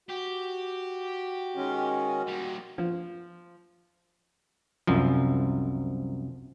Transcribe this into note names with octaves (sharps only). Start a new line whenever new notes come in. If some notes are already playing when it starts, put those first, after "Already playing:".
F#4 G4
D#3 G#3 C#4
A#2 G3
F3
C2 F#2 F3